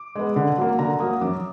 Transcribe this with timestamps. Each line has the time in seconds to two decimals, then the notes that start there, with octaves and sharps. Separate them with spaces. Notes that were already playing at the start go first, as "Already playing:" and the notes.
Already playing: D6
0.15 G#3 B3
0.36 D3
0.58 F#3 A#3
0.79 D3 A#5
0.99 F#3 A#3 D#6
1.21 F#2 D6